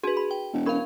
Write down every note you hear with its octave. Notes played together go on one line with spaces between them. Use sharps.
D4 F#4 G#4 B4
B5
G5
E1
C#4 A#4 F5 B5